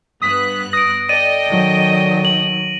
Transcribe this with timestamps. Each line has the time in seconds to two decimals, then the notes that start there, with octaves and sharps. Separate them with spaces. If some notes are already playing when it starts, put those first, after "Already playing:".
0.22 G2 B3 D#6 F#6 B6
0.73 D#6 A#6 D7
1.09 A4 D5 D#5 G5 D#7
1.48 D#3 F#3
2.25 F#7